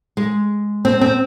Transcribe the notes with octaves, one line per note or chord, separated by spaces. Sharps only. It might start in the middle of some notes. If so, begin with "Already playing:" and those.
G#3
C4
C4